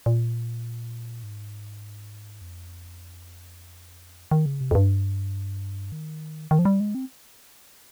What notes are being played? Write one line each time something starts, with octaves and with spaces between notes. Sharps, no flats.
A#2
G#2
F2
D#3
C#3
C3
F2
G2
D#3
D#3
F3
G3
G#3
C4